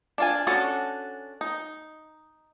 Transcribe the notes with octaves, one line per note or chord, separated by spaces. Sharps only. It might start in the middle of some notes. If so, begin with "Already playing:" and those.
D4 F4 G#5
C#4 D4 F#4 A4
D#4